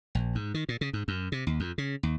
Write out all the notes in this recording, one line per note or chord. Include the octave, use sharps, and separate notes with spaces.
A#1
G#2
D#3
A#2
C#3
G#2
F#2
C3
D#2
F2
C#3
D#2